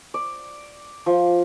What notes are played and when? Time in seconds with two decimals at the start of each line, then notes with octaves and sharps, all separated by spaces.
0.14 D5
1.06 F3